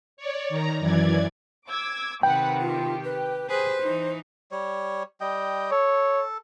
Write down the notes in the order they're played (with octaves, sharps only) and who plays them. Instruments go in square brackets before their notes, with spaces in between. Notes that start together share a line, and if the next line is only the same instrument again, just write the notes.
[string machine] C#5 D5
D#3 A#5
F#2 E3 D5 G#6
[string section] D6 E6 G#6
[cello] C3 D#3 [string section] B4 F#5 B5 [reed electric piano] G5
[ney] F4 [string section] G4
[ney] B4
[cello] G#4 B4 [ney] C5
[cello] E3 D#4
[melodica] G3 C#5
G3 D#5 G5
[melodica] A4 [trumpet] C#5